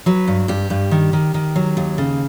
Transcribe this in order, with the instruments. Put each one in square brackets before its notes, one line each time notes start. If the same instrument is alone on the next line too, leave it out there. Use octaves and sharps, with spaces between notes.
[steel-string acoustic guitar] F#3 B4
G2
G2 G4
G2
D#3
D#3
D#3
F#3
D#2
C#3